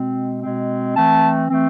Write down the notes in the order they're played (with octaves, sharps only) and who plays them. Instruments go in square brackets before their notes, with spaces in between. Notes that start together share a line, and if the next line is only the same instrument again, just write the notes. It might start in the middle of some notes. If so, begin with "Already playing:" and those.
Already playing: [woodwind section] B2 G#3 C4
B2 G#3 C4
E3 A3 C4 A5
E3 A3 C4